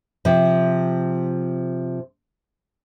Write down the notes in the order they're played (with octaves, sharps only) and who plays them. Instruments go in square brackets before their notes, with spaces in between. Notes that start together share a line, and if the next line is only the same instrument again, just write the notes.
[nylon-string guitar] C3 F3